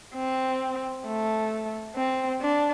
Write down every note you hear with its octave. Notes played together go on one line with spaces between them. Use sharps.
C4
A3
C4
D4